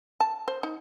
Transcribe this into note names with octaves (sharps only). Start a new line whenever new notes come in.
A5
C5
D#4